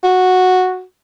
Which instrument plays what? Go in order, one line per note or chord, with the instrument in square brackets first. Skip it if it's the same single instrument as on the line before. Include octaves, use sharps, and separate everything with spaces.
[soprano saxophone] F#4